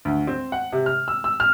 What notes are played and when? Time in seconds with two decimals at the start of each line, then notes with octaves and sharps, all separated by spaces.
0.05 D2
0.27 C4
0.52 F#5
0.72 C3
0.86 F6
1.08 E6
1.24 E6
1.40 F6